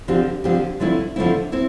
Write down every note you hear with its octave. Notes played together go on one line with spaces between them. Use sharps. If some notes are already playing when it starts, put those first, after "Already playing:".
D3 F3 C4 G4
D3 F3 C4 G4
D3 F3 A3 C4 E4
D3 F3 A3 C4 E4
C4 E4